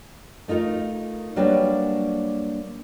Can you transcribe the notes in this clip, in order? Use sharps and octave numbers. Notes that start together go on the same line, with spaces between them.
A3 D#4 F4 A#4 D#5
F#3 G3 A#3 D4 B4 G5